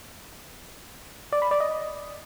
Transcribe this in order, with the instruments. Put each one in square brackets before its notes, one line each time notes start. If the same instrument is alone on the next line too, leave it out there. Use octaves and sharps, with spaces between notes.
[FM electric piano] D5
B5
D5
D#5